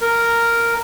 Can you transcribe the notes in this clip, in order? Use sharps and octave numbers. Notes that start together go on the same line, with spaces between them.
A#4